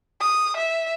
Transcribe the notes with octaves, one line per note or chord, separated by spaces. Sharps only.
D#6
E5